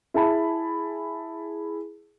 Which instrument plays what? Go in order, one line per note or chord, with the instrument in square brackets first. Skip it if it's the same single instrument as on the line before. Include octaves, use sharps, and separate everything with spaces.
[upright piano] E4 G#4 A5 B5